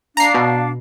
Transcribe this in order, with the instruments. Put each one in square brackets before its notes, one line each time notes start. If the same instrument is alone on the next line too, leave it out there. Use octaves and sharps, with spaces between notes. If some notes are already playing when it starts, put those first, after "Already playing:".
[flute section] D4 F5 [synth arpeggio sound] A#5 C7
[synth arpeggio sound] B2